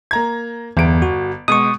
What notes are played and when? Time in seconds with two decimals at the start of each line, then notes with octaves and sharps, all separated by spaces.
0.11 A#3 A#5 G#6
0.77 G1 E2 D7
1.02 F#4
1.48 B2 G#3 C#6 D#6